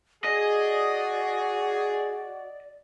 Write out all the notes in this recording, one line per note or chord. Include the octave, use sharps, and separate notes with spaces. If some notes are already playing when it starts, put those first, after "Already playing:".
F#4 G#4 D5 D#5